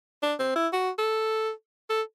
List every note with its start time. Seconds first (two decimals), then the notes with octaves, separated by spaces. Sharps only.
0.23 D4
0.39 C4
0.56 E4
0.73 F#4
0.98 A4
1.90 A4